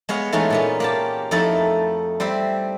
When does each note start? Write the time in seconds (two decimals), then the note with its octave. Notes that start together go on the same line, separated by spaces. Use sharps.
0.09 G#3 B3 C#5 F5
0.32 E3 G#3 A3 C#4 D#4 F4
0.50 A#2 B3 C#4
0.80 A#3 G4 A5
1.31 F2 A3 D#4 E4 A4 A5
2.20 G3 C4 C5 E5